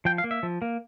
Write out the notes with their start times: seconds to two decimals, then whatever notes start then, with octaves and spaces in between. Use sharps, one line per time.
0.05 F3 G5
0.18 F5
0.24 A#3
0.31 E5
0.43 F3
0.62 A#3